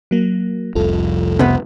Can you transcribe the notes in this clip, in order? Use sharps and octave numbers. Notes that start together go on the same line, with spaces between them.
F#3 A#3
F1 C2 F2 F4 A4
C3 B3